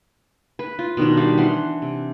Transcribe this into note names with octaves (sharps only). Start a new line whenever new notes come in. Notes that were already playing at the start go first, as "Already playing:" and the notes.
B4
F4
B2 D#3 D4
G3 F5
E3 F#5 C6
C3